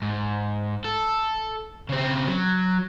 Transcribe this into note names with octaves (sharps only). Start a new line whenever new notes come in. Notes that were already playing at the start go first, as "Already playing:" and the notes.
G#2
A4
C#3 C4
F#3